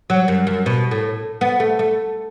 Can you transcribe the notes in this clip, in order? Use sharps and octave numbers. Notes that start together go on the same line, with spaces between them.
F#3
F#2
F#2
B2
A2
B3
A3
A3